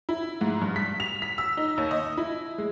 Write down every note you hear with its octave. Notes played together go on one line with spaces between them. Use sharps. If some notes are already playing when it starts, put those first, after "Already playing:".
E4
G#2
G2
B6
F7
B6
E6
D#4
D#2
D#5
E4
G#3